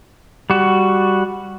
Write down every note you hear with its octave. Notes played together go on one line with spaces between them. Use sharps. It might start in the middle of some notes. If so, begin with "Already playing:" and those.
G3 F#4